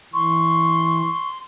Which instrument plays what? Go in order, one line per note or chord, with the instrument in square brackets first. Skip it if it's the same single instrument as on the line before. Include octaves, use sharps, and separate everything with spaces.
[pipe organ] E3 [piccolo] C6 [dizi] C#6